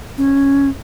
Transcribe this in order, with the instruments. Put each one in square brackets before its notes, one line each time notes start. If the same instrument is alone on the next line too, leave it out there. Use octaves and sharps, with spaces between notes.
[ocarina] C#4